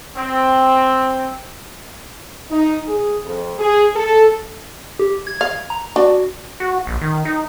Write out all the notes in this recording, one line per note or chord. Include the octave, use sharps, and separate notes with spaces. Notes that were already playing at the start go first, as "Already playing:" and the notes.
C4
D#4
G#4
F2
G#4
A4
G4
G#6
F5
A#5
D4 F#4
F#4
A#1
D#3
D#4